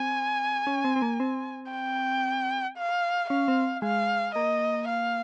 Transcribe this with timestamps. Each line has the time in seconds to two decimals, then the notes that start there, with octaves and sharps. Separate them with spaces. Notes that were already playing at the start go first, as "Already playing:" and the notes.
Already playing: C4 G#5
0.67 C#4
0.85 C4
0.96 C4
1.02 A#3
1.20 C4
1.72 G5
2.78 F5
3.30 C#4 F5
3.48 C4
3.82 G#3 F5
4.35 A#3 D#5
4.88 F5